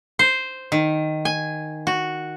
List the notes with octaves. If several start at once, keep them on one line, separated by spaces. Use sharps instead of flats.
C5
D#3
G#5
F#4